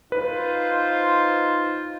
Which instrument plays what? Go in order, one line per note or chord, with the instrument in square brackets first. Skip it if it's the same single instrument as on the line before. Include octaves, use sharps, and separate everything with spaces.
[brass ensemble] D#4 C5 [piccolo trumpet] F4 [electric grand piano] B4